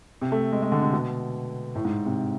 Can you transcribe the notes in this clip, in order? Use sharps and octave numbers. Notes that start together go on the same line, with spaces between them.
C3
A3
G#3
G#3
D3
C3
B2
A2
G#2
C3